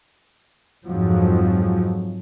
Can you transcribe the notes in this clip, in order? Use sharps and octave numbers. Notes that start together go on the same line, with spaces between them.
F2 G#2 F3 F#3